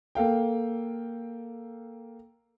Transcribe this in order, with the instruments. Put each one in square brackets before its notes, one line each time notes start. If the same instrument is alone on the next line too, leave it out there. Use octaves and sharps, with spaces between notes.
[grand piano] A#3 A4 F5 G5